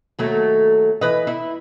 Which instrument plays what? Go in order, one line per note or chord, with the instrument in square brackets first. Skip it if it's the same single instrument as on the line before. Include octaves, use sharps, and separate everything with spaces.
[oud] D#2 F#3 A3
E3 B4 D#5
E4